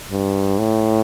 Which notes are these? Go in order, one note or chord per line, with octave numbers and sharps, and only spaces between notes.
G2
A2